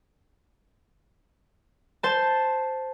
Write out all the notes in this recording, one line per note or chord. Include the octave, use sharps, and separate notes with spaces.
C5 A5